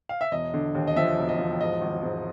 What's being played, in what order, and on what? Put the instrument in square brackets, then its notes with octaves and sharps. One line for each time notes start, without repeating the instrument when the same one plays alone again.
[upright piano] F5
E5
E1 D#5
D3
D#2
D#5
F3 E5
E1
D#5
F3
G#2 D#5
G#1
G#2